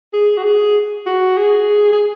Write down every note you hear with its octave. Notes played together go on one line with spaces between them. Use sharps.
G#4
F#4
G#4
F#4
G#4
G#4